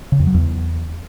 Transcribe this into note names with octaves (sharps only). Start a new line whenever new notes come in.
C#3
F2
F#3
E2